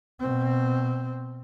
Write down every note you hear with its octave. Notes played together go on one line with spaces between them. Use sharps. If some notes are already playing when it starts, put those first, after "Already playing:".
B2 C4